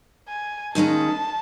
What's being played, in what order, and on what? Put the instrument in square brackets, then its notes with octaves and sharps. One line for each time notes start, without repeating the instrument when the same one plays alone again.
[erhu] G#5
[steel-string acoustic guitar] D#2 D#3 G#3 C#4 G#4 [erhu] A5